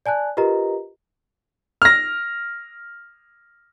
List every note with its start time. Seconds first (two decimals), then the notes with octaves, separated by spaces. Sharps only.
0.06 D5 G#5 A5 F#6
0.37 F4 G4 A#4 B4 D#5 A#5
1.82 F6 A#6